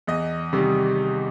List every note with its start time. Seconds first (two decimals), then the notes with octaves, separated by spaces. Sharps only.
0.07 E2 D#5
0.53 C3 D#3 G3